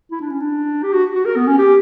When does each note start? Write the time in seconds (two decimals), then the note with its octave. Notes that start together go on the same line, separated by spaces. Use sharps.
0.11 E4
0.21 D4
0.30 C#4
0.40 D4
0.83 G4
0.93 F#4
1.15 F#4
1.25 A#4
1.36 B3
1.47 C#4
1.58 G4